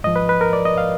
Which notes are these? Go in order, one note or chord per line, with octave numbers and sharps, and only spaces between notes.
G#2 F3 D#5
B4
B4
A#4
D5
D#5
F5